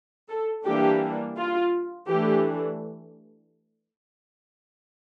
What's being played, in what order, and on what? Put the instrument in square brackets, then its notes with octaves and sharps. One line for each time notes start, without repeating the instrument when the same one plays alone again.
[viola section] A4
E3 G3 A#3 D4 G4
F4
E3 A3 D4 G4